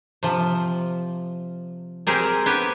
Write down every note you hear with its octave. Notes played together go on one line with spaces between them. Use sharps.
C3 F3
C4 G4 G#4 A#4
B3 G4 G#5